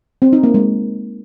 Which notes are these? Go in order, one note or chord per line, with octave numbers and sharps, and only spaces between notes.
C4
D#4
A#3
G#3